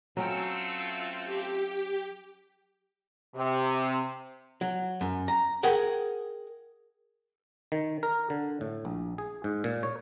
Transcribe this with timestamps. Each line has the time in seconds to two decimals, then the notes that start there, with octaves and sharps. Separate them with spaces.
0.17 F#3 A3 C4 C#4 F4 G5 E6 C#7
1.25 G4
3.35 C3
4.61 F#3
5.01 F#2
5.28 A#5
5.63 G#4 A#4 F#5 G5
7.72 D#3
8.03 A#4
8.30 D3
8.61 A2
8.85 A#1
9.18 G#4
9.44 G#2
9.64 A#2
9.83 C#5